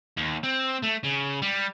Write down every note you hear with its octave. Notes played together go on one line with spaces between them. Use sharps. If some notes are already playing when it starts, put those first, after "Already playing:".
D#2
C4
A3
C#3
G3